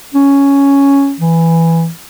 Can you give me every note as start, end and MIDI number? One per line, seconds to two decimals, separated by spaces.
0.14 1.15 61
1.20 1.89 52